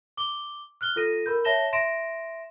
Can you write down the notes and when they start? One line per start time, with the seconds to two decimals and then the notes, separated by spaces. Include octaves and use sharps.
0.17 D6 G7
0.81 F6 F#6 G7
0.96 F4 A4 A#6 D#7
1.26 A#4 B5 G6
1.45 C#5 E5 A5 A#6 E7 G7
1.73 E5 C6 A#6 D7 E7